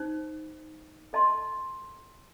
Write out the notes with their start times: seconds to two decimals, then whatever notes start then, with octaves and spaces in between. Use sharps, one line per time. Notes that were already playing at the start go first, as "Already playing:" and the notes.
Already playing: D#4 C5
1.13 A4 D#5 A5 C6